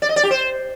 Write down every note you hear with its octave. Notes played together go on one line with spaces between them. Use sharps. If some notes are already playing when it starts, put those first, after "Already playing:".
D5
D#5
D5
G4
C5